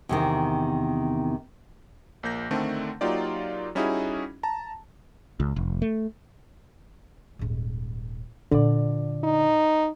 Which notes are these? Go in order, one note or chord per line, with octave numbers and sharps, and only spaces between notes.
E2 C3 D#3
A#1 A#3 G6 A#6
D3 D#3 A3 C4 D4
F#3 A#3 D#4 F4 G4 D5
G3 C#4 D#4 E4 F#4 G#4
A5 A#5
C#2
F1
A3
D#1 G#2
A#2 D3 F4 D5
D#4